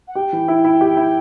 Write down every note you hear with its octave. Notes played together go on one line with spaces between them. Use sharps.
F#5
G4 G5
E3
E4
E4
G4
E4